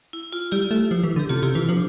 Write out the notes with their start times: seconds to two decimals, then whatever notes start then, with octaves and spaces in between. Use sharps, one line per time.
0.13 E4
0.33 F4
0.51 G3 E4 G4
0.71 A3
0.91 F3
1.04 E3
1.16 D3
1.19 G4
1.29 C3 F4 A4
1.43 C3 E4 G4
1.55 E3 F4
1.69 F3 D4